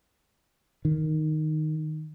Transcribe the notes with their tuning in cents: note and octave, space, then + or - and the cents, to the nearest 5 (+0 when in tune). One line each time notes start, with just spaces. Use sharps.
D#3 -5